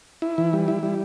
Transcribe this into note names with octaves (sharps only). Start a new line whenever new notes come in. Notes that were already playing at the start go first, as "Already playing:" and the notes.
E4
E3
G3
E4
G3